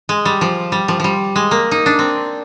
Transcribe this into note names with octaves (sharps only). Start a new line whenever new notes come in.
G#3
G3
F3
G3
F3
F3 G3
G#3
A#3
D#4
D4
C4